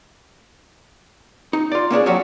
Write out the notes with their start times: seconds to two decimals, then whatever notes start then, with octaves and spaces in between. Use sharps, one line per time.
1.53 D#4
1.72 F4 D5
1.90 A#3 C#4 D4 G#4
2.06 F3 F#3 C#4 D4 F#4 G4